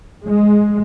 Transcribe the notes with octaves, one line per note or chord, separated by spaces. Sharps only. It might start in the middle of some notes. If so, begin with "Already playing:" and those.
G#3